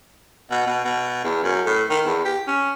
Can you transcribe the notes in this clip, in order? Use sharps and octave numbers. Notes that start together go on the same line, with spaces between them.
B2
B2
B2
E2
F#2
A2
D#3
E2
G4
C#4